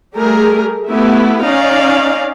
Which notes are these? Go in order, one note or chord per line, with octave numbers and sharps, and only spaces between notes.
G3 A3 G4 G#4 A#4
A3 B3 E4 G4
C#4 D#4 D5 D#5 F5